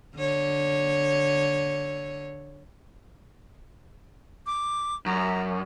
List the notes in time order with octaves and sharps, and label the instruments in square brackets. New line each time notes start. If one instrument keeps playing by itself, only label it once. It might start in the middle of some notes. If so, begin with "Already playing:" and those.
[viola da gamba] D3 C#5
[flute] D6
[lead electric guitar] F#2 [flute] A#5